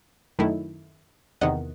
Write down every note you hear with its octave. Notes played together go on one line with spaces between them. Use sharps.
F#2 D#3 A3 E4
E2 C3 D#3 D#5 F#5